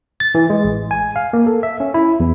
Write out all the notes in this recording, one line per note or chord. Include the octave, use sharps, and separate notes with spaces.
A6
E3
G#3
A1
G#5
F5
A#3
A4
E5
C#4
E4
E2